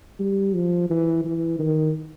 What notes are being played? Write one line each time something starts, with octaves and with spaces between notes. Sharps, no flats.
G3
F3
E3
E3
D#3